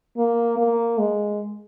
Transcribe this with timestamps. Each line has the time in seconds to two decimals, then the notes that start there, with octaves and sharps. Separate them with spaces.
0.18 A#3
0.58 A#3
0.98 G#3